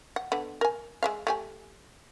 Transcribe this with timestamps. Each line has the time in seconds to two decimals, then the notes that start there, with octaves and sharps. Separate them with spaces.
0.16 F#5
0.32 D3 B3
0.61 A#4 G#5
1.03 G#3 E5 F5
1.27 A3 G4 G#5